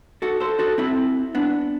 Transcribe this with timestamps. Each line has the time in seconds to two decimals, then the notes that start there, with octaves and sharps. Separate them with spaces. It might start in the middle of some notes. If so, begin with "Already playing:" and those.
0.22 F#4 A4
0.40 A4 C5
0.59 F#4 A4
0.78 C4 E4
1.35 B3 D4